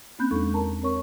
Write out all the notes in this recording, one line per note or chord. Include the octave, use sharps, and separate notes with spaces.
A#3 C4 C#4 B5 F#6 G6
E2 G#3 D4 D#4 A4 C#6
A#4 A5 A#5
C4 A#4 C#5 C#6